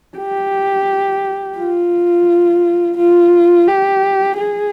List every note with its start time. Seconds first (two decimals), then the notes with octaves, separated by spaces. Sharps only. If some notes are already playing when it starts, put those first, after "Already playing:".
0.17 G4
1.58 F4
2.98 F4
3.68 G4
4.38 G#4